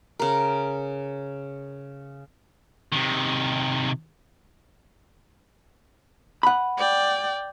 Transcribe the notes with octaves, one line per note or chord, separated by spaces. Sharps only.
C#3 A#4
C3 D#3
F#5 B5
D5 G5